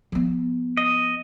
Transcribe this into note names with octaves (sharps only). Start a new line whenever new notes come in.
F3 B3
D#5